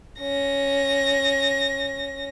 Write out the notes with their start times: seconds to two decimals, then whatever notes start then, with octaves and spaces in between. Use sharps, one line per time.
0.21 C#4 A#6